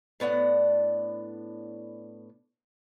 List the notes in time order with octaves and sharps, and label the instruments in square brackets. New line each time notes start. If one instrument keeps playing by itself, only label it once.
[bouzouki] A2 B3 D4 F#5